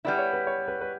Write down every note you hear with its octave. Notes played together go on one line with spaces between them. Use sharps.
G3 B3 E4 D5
C#5
B4
C#5
B4
B4